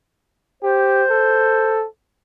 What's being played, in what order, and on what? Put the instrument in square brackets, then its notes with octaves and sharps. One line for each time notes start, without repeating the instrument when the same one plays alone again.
[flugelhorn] G4 [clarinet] C5
[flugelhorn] A4